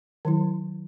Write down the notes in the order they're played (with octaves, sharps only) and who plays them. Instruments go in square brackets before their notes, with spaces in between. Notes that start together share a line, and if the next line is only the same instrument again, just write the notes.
[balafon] D#3 F#3 E4